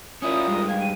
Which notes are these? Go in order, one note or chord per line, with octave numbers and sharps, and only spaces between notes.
C#4 E4 F4 A#4 D5 D#6
G2 G#3
F5 G5 G#6
D#7